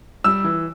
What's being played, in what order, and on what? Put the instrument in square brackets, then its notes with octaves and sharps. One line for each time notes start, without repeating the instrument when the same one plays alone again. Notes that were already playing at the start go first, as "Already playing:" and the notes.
[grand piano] G3 [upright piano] E6
[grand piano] E3